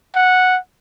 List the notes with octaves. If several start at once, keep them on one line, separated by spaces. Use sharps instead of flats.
F#5